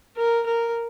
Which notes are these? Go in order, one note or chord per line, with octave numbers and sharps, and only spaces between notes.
A#4
A#4